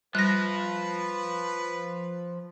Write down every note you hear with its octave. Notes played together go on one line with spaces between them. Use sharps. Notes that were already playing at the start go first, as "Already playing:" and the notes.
F3 G3 B4 F#6 A#6